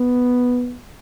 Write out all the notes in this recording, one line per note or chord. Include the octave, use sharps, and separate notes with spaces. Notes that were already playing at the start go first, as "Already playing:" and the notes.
Already playing: B3